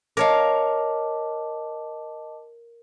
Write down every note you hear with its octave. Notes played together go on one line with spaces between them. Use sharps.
A#4 C#5 D#5 F5 A5 D6